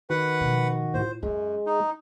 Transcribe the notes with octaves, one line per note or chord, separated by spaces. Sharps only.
D#3 F#4 B4 F#5
B2 F3
A2 F4 C5
F#2 G#3 C#4
D#4